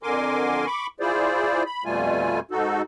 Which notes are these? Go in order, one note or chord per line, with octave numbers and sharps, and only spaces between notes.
F2 D3 A#4 G#5 C6 D6
B5 C#6 D6
E4 F4 G#4 C5 D5
B5
F2 B2 G3 A3 F4 G#5
G#2 D#4 F#4 A4